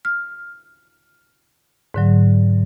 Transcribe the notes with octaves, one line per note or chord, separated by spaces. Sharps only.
F6
G#2 D3 F#3